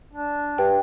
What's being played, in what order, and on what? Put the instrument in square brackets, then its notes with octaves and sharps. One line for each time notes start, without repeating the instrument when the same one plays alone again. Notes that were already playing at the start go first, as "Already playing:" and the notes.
[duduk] D4
[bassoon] G2 [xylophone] G5